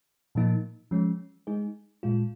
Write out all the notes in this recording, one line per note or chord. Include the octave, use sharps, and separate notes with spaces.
A#2 F3 A#3 D#4
F3 G#3 C#4
G#3 D#4 G#4
A#2 G#3 F4